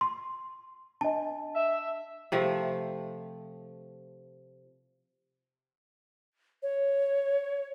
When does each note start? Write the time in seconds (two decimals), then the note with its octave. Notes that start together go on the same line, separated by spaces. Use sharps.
0.01 C6
1.01 D4 D#5 A5
1.55 E5
2.32 C3 F3 A3
6.63 C#5